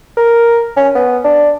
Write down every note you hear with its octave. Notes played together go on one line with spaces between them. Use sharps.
A#4
C#4
B3
D4